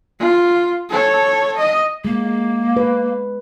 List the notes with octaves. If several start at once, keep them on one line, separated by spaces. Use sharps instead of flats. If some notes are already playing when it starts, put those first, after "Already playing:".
F4
A4 C#5
D#5
G#3 A#3
B4